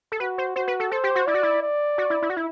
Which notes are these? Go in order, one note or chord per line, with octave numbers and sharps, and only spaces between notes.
A4
F#4 B4
C5
F#4 C5
B4
A4
A4 C5
G4
F#4
E4 D5
F#4
E4
D5
F#4
E4
E4
F#4
E4